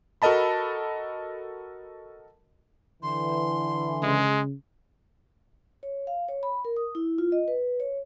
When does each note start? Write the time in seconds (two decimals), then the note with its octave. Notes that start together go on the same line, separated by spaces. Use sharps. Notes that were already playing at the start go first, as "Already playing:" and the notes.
0.22 F#4 A4 A#4 D#5 A5 B5
3.03 D3 E3 C6
4.03 C#3 G#3
5.83 C#5
6.07 F5
6.28 C#5
6.43 B5
6.65 A#4
6.77 D#6
6.95 E4
7.18 F4
7.32 D#5
7.48 B4
7.80 C#5